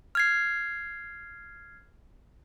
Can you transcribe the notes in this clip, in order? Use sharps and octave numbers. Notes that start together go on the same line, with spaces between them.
F6 G#6 C7